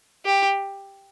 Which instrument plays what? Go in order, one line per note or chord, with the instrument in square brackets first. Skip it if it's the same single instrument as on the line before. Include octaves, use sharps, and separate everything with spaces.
[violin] G4